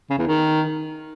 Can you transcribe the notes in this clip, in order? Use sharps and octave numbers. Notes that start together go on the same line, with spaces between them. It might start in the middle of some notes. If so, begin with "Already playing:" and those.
C#3
E2
D#3